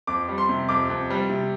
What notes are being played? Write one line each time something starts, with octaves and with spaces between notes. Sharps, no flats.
F2 D6
G3
C6
C3
F2 D6
F2
G3
C3